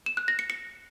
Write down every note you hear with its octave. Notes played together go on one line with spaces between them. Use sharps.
E7
F#6
A#6
C#7
C#7